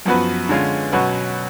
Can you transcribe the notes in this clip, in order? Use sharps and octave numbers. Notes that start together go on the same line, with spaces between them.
F#2 F3 B3 F#4 B4
D3 G#3 C#4 F4
B2 F#3 C#4 F#4 B4